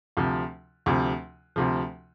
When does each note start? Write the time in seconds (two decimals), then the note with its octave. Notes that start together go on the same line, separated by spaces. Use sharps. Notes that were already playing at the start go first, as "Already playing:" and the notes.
0.17 D2 C3 F3
0.86 D2 C3 F3
1.56 D2 C3 F3